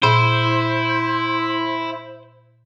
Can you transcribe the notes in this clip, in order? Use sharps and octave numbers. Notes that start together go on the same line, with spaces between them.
A#2 E4 C5